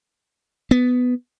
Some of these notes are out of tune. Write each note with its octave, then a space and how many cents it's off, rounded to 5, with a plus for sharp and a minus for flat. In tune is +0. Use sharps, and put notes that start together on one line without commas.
B3 +10